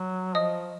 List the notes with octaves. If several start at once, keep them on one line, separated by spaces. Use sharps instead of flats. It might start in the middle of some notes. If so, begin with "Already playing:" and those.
Already playing: F#3
F3 D#5 D#6